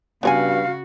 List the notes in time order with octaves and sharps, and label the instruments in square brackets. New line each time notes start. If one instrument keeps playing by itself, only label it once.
[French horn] G2 [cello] C#3 F#4 [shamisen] B3 C#5 G#5 [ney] F5